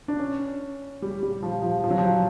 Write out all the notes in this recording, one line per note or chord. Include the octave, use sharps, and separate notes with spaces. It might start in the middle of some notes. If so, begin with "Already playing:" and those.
D4
C#4
G3
G3
F3
F3
F3
F#3
F3